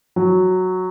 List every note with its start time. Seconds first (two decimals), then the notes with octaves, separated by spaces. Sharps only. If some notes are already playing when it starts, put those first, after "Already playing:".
0.16 F#3